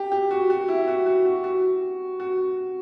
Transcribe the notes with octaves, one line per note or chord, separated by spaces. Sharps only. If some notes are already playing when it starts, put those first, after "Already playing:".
Already playing: G4
G4
F#4
F#4
E4
F#4
F#4
F#4
F#4
F#4